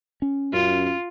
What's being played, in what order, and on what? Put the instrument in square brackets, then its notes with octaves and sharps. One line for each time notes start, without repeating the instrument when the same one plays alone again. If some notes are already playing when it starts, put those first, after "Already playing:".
[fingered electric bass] C#4
[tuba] F#2 [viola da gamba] F4